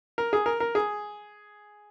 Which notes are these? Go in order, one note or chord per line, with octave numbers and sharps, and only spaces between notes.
A#4
G#4
A#4
A#4
G#4